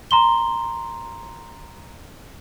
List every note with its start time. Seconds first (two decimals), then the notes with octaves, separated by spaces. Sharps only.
0.11 A#5 C6 G7